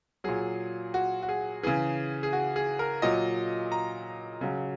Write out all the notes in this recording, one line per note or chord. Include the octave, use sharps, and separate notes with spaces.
A#2 F#3 G#4
F#4
F#4
G#4
C#3 E3 G#4
G#4
F#4
G#4
A#4
A#2 F#3 D#5
A#5
C#3 F#3